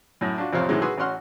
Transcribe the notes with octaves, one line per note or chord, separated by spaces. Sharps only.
F#2 A2
D4 F4 F#4
A1 F2 C3 C4 C#5 F5
A2 C3 D#3 E3 F#3 G#3
F#4 G#4 B4 C6 E6
A1 C#4 F#4 F#5 C6 F6